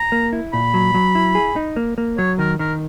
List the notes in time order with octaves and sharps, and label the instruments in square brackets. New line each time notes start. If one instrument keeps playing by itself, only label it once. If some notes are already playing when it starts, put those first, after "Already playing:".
Already playing: [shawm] A#5
[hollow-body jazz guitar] A#3
E4
[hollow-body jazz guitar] A#2 [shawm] B5
[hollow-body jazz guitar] F#3
F#3
E4
G#4
D#4
A#3
A#3
[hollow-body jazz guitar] F#3 [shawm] C#5
[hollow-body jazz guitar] D#3 [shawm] A#4
[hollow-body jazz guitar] D#3 [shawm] A#4